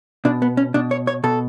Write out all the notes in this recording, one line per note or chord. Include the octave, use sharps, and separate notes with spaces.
B2 D4
B3
C#4
B2 D4
C#5
C#5
B2 A4